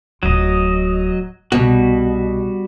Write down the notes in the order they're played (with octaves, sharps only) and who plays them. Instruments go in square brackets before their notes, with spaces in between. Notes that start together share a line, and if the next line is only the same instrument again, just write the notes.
[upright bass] D1 F4 [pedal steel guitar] F#3 D#5
[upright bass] C2 [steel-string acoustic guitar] B2 [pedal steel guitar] G3 F#4